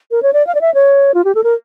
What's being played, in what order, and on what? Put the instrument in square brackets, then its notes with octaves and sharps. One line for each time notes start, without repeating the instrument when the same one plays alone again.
[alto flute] A#4
C#5
D5
F5
D5
E5
C#5
F4
G4
A4
A#4